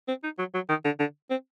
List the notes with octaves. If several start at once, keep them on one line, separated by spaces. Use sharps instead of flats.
C4
D#4
F#3
F#3
D#3
D3
D3
C4